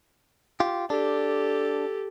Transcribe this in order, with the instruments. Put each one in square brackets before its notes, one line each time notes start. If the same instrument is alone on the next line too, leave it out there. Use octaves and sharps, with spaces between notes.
[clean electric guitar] F4 G4
[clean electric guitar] D4 [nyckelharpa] G4 A4